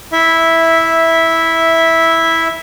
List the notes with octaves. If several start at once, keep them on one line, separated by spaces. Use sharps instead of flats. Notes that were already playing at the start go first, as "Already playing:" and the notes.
E4 E5